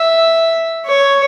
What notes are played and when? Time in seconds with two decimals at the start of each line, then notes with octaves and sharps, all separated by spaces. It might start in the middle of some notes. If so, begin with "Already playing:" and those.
Already playing: E5
0.86 C#5